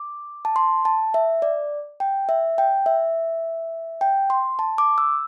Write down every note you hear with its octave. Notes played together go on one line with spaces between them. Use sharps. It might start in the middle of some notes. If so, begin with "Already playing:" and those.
Already playing: D6
A5
C6
A5
E5
D5
G5
E5
G5
E5
G5
C6
A5
D6
E6